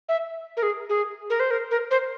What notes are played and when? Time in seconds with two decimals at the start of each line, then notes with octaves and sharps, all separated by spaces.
0.09 E5
0.57 A#4
0.63 G#4
0.89 G#4
1.30 A#4
1.40 C5
1.51 A#4
1.71 A#4
1.91 C5